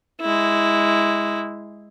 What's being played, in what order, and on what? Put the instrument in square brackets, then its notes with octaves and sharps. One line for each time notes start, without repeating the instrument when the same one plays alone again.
[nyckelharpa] G#3 E4